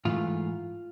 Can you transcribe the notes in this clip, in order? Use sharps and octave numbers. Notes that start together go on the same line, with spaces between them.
G#2 E3 A3 F4